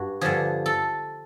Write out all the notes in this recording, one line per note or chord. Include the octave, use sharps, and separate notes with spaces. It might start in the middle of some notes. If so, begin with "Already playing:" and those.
Already playing: G2 F#4
G2 D3 F3 G#4
A4